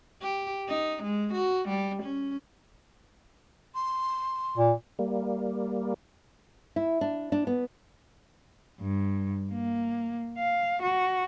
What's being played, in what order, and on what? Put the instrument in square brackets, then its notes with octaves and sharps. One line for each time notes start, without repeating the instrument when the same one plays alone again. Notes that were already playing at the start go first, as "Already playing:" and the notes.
[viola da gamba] G4
D#4
G#3
F#4
G3
C#4
[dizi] C6
[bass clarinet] A#2
[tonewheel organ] G3 A#3
[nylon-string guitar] E4
D4
D4
B3
[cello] G2
A#3
F5
F#4